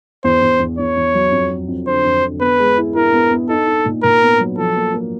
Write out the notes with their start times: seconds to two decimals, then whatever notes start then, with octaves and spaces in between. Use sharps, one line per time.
0.24 E2 C5
0.42 E2
0.60 E2
0.79 E2 C#5
0.97 E2
1.14 F#3
1.32 F2
1.51 F2
1.68 F2
1.87 D3 C5
2.05 F2
2.22 D3
2.41 B3 B4
2.59 G#3
2.77 E4
2.95 E4 A#4
3.13 B3
3.31 B3
3.49 D#4 A4
3.67 D#4
3.85 A#2
4.03 A#2 A#4
4.22 B3
4.40 F#3
4.57 F3 A4
4.77 A#3
4.94 A#3